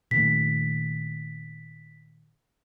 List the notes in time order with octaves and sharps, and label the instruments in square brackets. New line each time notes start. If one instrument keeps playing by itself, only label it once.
[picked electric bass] A#2 D#3 A3 [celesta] B6